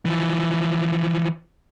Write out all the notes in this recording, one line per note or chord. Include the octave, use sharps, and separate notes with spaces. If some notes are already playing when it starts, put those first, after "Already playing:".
E3 F3